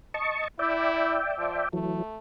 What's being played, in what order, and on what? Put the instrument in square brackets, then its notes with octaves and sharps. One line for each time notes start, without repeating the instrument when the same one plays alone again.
[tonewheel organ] D#5 A5 C#6
[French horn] E4 [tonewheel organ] D5 E5 G5
[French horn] F3
[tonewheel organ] E3 F#3 [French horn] A3